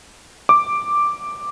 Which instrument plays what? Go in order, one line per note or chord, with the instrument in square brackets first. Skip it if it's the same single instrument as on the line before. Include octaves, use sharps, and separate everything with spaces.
[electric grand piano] D6